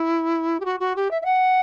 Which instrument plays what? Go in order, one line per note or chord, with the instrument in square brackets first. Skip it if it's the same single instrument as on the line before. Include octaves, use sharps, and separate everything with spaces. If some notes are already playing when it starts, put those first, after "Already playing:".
Already playing: [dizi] E4
G4
F#4
F#4
G4
E5
E5
F#5